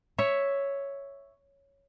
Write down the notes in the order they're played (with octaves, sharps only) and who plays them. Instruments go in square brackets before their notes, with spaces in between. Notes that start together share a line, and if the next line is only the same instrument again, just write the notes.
[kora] C#5 E5